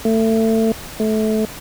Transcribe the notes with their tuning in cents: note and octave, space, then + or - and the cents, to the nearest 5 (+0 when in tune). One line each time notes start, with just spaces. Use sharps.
A3 +25
A3 -20